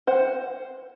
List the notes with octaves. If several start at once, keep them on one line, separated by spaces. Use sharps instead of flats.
C5 F#5